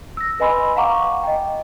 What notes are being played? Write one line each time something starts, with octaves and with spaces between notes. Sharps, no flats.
E6 A#6
B4 D#5 G#5 B5 C6 E6
F5 F#5 A#5 C#6 D6
D#5 G5